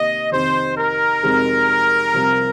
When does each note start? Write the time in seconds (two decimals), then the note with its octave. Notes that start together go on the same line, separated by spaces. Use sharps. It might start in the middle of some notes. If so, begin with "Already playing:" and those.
Already playing: C3 D#3 A#3 D#5
0.31 F2 C3 D#3 C5
0.77 A#4
1.23 F2 C3 G#3 D#4
2.13 C2 C3 F3